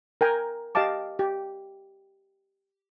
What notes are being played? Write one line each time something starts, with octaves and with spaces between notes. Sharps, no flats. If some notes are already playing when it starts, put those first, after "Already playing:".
A#4 G5 G#5 A#5
G4 D#5 F5 A5 D6
G4